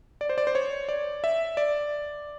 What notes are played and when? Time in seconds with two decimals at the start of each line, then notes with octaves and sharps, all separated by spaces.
0.21 D5
0.29 C5
0.38 D5
0.47 C5
0.55 C#5
0.89 D5
1.24 E5
1.57 D5